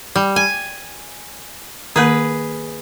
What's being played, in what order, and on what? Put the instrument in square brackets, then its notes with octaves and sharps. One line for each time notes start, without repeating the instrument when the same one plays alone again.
[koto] G3
G#5
[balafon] D#3 A#3 [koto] G#4 B4